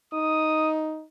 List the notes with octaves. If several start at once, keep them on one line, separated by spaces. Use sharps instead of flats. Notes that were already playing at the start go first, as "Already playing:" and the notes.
D#4 D#6